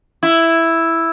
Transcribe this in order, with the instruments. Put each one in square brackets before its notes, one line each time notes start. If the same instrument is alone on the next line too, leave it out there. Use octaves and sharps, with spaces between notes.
[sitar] E4